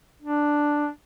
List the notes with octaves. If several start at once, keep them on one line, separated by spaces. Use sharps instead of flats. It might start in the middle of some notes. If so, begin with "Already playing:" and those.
D4